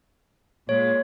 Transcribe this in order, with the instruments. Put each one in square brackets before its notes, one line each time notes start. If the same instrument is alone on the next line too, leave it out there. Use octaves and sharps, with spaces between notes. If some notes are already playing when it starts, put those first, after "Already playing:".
[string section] A#2 G#3 [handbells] C#5